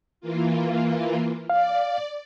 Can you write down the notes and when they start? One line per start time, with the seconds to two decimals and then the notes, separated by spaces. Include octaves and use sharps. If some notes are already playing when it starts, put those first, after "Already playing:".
0.21 E3 A#3 F4
1.50 D5 F5